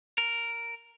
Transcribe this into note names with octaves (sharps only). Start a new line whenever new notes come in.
A#4